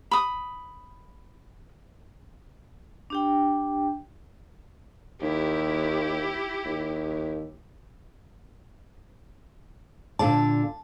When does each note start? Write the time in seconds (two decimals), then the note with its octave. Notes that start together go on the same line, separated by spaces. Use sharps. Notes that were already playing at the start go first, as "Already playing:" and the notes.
0.11 B5 D#6
3.10 D4 G4 G5
5.21 D#2 E4 G4
6.65 D#2
10.19 A#2 D3 D5 A5